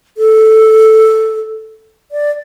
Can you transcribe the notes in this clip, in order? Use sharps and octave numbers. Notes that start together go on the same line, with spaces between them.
A4
D5